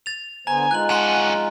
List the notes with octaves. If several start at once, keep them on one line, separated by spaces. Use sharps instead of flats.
A6 F7
D3 B3 C5 G#5 A#5
G#3 D#4 F4 F#6 F#7
F2 C#4 F#5 G#5 C6